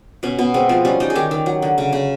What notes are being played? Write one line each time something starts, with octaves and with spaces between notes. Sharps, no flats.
B2 C#4
B2 B3
G#3 C4
F3 C4
G3 C#4
G3 D#4
G#4
D#3 G4
D#3
F#3
D3
C#3
C#3